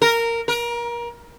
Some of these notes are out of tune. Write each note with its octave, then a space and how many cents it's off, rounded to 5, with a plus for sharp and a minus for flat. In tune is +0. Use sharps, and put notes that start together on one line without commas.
A#4 -10
A#4 +30